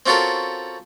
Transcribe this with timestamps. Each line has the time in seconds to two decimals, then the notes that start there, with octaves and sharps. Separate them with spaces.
0.06 C4 C#4 F4 F#4 A4 A#4